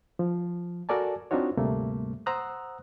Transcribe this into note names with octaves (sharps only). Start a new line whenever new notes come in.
F3
F#4 A4 A#4 D5 G#5 A5
C4 D4 D#4 F4 F#4 C#5
D2 G#2 C3 G3 A3 A#3
C5 F#5 A#5 D#6 E6 F#6